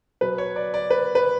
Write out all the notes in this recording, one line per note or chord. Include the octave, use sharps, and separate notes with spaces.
B2 F#3 B3 B4
C#5
D5
D5
B4
B4